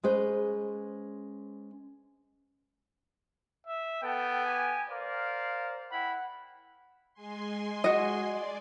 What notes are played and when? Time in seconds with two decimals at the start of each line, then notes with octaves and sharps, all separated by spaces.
0.03 G#3 C#4 G#4 B4 C5
3.67 E5
4.03 B3 A4 G5
4.46 G4 G#5
4.89 A#4 C5 D5 F5
5.91 E4 F#5 G5 B5
7.14 G#3 G#5 C6
7.84 F#4 D#5
8.24 D5